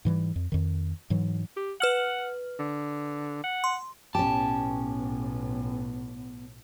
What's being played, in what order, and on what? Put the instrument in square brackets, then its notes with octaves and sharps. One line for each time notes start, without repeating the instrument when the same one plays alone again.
[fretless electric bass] G#2 E3 F3 G3
F2
F2 D#3
G#2 E3 F#3
[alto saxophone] G4
[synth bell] B4 F6 F#7 [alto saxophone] F#5
[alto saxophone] D3
F#5
[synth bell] C6
[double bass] B1 A2 [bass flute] B3 [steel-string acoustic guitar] C#4 G4 [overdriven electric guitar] A5